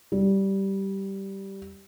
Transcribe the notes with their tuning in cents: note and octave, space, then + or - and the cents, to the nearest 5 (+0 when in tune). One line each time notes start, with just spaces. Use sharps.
G3 -10